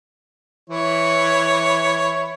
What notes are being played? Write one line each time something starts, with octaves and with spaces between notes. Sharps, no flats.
E3 E4 C#5